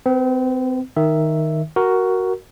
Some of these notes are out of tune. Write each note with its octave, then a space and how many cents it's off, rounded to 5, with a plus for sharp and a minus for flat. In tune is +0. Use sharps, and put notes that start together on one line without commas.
C4 -30 B4 +0
D#3 +0 E5 +0
F#4 +10 A#4 +0